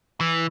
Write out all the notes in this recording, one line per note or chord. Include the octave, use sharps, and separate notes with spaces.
E3